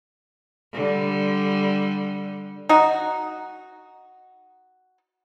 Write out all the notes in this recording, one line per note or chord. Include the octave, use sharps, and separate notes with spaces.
D3 G3
D#4 F#4